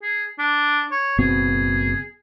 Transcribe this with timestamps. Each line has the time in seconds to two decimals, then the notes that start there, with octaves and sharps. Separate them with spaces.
0.03 G#4
0.38 D4
0.91 C#5
1.19 F#1 B2 C4 G#4